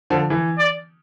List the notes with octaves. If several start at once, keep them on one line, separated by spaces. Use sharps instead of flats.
D3 F3
E3
D5